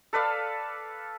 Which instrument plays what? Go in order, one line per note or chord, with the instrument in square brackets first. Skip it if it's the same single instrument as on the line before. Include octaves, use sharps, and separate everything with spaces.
[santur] A4 B4 D5 F5